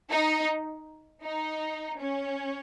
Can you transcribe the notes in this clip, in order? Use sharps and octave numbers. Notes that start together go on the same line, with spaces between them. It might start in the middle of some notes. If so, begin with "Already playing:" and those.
D#4
D#4
C#4